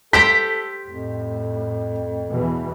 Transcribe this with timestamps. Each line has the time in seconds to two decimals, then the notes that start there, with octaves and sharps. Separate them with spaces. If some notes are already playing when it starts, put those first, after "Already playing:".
0.13 G4 A4 C5 G5 B6
0.87 F2 A2
2.29 E2 B2 E3